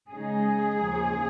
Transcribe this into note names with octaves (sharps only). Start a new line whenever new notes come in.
C#3 G#3 D#4 G#4
D#2 C#3 F3 A#3 D#4